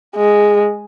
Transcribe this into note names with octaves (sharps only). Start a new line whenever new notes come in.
G#3